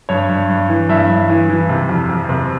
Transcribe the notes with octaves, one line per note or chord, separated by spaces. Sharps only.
G2 C#5
G2
G2
E3
G2 E5
G2
E3
E3
C3
F2
F2
C3